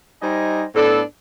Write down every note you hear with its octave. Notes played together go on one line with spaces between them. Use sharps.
G3 D#4 C5 D#5 G#5
A2 B3 D4 A4